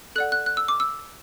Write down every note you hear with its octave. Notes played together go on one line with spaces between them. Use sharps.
A4 D5 F#5 F#6
F#6
F#6
E6
D6
E6